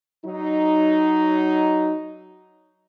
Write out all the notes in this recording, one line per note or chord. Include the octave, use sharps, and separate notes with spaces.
F#3 D#4